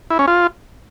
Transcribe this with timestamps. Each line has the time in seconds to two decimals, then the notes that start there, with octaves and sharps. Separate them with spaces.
0.10 E4
0.19 C#4
0.28 F4